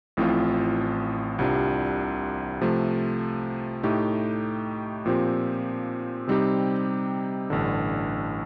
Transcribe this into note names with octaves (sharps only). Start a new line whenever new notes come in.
A1 A2 F3 C4 F4
C2 C3 G3 D4 F4
C3 F3 A3
A2 A3 D#4 G4
A#2 F3 C4 G4
C3 G3 C4 D#4 G4
A1 G2 D3